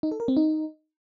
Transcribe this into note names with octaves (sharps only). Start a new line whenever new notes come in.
D#4
A4
A#4
C4
D#4